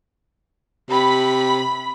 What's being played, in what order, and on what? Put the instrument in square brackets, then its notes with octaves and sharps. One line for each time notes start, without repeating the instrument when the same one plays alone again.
[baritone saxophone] C3 [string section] B5